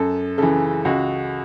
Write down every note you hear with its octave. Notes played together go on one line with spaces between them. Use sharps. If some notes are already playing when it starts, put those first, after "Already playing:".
Already playing: F#2 A4
C#3 E3 A4
C#2 F#4